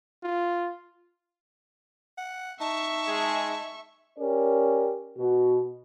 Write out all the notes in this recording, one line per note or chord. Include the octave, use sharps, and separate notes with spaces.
F4
F#5
D#4 E5 A5 C#6
G#3 G#4
C#4 G4 A#4 D5
B2 F#4